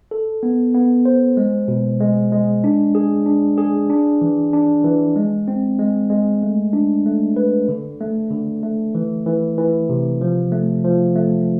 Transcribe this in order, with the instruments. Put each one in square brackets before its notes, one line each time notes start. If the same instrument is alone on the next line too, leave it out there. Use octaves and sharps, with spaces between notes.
[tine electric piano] A4
B3
B3
C5
G#3
B2
G#3
G#3
D4
G#4
D4
G#4
D4
E3
D4
E3
G#3
C4
G#3
G#3
A3
D4
A3
B4
D3
A3
D3
A3
E3
E3
E3
C3
F3
A3
F3
A3